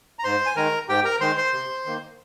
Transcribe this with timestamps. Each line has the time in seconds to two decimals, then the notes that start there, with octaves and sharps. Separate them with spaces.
0.19 A#5
0.24 G#2 C5 C6
0.46 G#5
0.56 D#3 G#3 A#4 A#5
0.89 G#2 G4 G5
1.05 A#4 A#5
1.20 D#3 G#3 C5 C6
1.37 C5 C6
1.53 C3
1.86 D#3 A#3